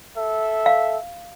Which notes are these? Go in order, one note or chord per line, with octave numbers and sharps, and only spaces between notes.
A4 E5
F5